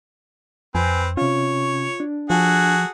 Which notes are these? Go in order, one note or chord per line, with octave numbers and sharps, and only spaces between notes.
F2 C4 B4 G#5
C3 C#4 F4 C#5
D4
F3 F#4 G#4 A4